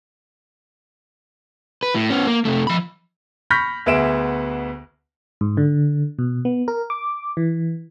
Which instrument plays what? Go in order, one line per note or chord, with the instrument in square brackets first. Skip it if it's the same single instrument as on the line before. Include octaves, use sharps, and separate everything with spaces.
[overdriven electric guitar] B4
A2
B3 C#4
A#3
C3 A3
F3 B5
[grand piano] B5 C#6 F6 G6 A#6 B6
D2 B3 G#4 E5 D7 E7
[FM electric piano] G#2
D3
B2
B3
A#4
D6
E3